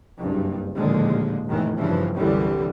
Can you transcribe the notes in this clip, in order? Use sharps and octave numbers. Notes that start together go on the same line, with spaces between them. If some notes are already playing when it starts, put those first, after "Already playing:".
F#1 C2 G2
A1 D#2 A#2 D3 F3 G#3
F1 E2 A2 D#3 E3
G2 C#3 E3 F3
C2 F#2 D3 E3 G3